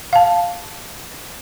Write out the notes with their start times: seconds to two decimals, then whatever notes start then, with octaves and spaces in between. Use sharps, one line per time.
0.13 F5 A5